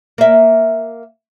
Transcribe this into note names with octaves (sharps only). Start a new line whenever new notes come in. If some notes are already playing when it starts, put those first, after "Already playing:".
A#3 E5